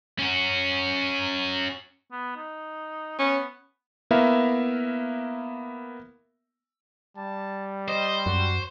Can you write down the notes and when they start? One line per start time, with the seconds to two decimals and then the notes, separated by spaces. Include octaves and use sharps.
0.19 C#4 F#4
2.12 B3
2.36 D#4
3.19 B3 C#4
4.11 A#3 B3 E4 A#4 E5 F5
7.17 G3 A5
7.88 C5 D#5
8.26 F#2 F#4